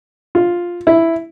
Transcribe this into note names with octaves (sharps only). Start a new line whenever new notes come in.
F4
E4